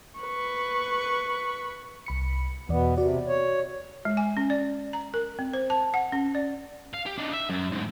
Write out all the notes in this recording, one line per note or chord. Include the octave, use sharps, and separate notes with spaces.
B4 C#6
C2 B5 C#7
E2 B2 B3 D5
C3 F#4 D5
C#5
G#3
G#5
C#4
D5
A#5
A#4
C4
C5
A5
F#5
C#4
D5
F5
G4
D4 D#4
E5
F#2
D2 G#2